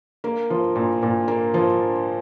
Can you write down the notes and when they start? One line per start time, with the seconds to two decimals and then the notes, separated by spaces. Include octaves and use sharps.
0.24 A#3
0.50 F3
0.76 A#2
1.03 A#2
1.28 A#3
1.54 F3